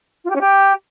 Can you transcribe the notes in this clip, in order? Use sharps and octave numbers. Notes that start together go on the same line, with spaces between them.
F4
G4
C#4
G4